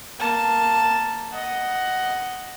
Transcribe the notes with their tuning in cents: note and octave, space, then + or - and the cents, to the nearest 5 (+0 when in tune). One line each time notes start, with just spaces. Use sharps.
A#3 -5 A5 +0
D#5 +0 F#5 +10